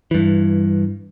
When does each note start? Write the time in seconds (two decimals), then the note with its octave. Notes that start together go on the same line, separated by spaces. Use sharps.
0.11 G2 E3